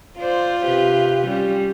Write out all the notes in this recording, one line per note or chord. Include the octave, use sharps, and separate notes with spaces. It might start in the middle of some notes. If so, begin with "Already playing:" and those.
F4 C5 D5
C3 G4 B4
G3 C#4